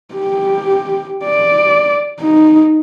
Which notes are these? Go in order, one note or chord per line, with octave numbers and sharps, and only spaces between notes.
G4
D5
D#4